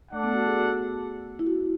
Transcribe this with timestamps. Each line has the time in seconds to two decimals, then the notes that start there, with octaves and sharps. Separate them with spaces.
0.12 A3 D4 A4 D5 F#5
0.24 B3
0.34 F#4
0.46 G#4
0.56 F#4
1.39 E4
1.47 F#4